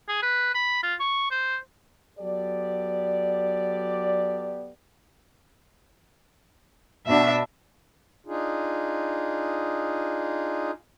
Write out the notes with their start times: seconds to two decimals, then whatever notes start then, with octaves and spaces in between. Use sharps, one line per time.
0.08 G#4
0.22 B4
0.54 B5
0.83 F4
1.00 C#6
1.31 C5
2.19 F#3 B3 G4 A4 D5
7.07 B2 D4 E5
8.26 D4 D#4 F4 G#4